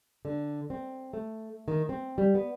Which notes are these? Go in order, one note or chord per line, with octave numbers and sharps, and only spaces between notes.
D3
C4
A3
D#3
C4
G3
B3